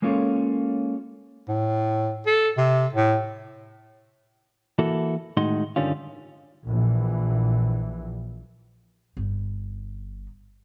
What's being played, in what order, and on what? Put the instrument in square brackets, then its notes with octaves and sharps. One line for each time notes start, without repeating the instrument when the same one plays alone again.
[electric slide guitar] G#3 A#3 C#4 F4 A4 C#5
[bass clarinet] A2
A4
C3
A2
[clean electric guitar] E3 A#3 E4 F#4 A4
A2 D#3 G#3 D#4 F#4 C6
G2 D3 D#3 G3 C#4 F4
[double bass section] A#1 E3
[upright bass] G1 D#4